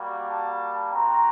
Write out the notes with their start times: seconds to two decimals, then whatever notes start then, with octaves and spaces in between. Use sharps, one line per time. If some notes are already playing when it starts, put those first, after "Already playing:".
Already playing: G3 A#3 F#4
0.30 A5
0.92 C4 F#4 A#5